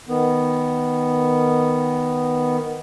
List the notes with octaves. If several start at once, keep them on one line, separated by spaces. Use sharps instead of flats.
D#3 B3